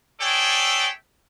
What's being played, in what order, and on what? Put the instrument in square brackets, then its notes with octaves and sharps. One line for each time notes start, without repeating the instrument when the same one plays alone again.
[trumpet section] G#4 A4 C#5 D5 E5 G5